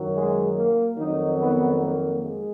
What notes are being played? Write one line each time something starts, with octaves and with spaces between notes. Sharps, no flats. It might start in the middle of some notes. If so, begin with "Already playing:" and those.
Already playing: F#2 D#3 F#3
G#3
A#3
F2 D#3 F#3 D#4
B3
A#3
G#3